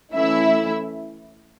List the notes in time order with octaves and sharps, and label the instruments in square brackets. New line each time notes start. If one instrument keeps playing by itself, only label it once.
[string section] E3 A3 C#4 E4 E5